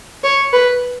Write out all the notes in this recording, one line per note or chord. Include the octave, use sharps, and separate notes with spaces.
C#5
B4